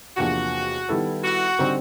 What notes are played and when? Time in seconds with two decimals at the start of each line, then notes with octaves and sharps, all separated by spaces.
0.17 E2 C3 F3 A#3 D4 F#4
0.89 D#3 G3 B3 E4 A4
1.23 F#4
1.59 D3 G3 C4 D#4